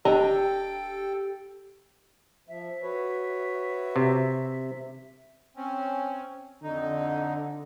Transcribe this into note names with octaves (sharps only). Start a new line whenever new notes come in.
D1 D4 G4 A4 D#5 G5 A#5
F3 E5
F#4 B4 C#5
C3
C4 C#4
F2 D3 D#4